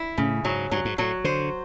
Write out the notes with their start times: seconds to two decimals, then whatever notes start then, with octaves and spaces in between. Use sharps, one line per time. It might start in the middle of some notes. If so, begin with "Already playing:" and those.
Already playing: E4
0.18 A2 C#3
0.45 G#2 F#3
0.71 G2 F#3
0.85 G#2
0.98 A2 F#3
1.24 D3 C5